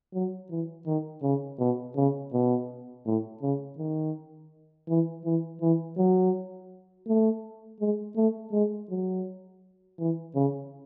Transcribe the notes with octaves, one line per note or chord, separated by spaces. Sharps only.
F#3
E3
D#3
C#3
B2
C#3
B2
A2
C#3
D#3
E3
E3
E3
F#3
A3
G#3
A3
G#3
F#3
E3
C#3